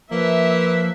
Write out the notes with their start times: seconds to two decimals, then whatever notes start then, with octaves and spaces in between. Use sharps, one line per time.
0.11 F3 A#3 B4 E5